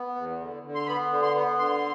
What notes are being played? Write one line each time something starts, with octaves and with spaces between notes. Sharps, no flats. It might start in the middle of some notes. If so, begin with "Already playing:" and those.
Already playing: B3
E2
D3
D3
C6
B3 B5
D3
C6
B3
D3 C6